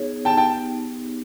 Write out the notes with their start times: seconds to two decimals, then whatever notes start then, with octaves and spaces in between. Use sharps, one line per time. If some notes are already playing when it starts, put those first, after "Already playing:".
Already playing: B3 D#4 G#4 C#5
0.25 B3 D#4 G4 G5 A5
0.37 G5 A5